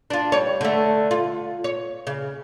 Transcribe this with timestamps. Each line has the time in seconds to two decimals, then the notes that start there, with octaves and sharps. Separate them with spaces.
0.10 D4 F4
0.32 G3 C#5
0.61 D3 A3
1.11 F4
1.64 C#5
2.07 C#3